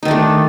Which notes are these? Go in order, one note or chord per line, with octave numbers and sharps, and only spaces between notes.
D#3 A3 D4 D#4